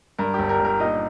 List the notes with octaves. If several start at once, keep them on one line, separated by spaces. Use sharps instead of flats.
G2 A#4
G1 G4
A#4
G1
A#4
A#2 D#4 D#5